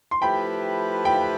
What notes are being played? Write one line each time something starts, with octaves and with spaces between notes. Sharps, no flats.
C6
F3 A3 E4 G4 B4 G5 B5
G5 B5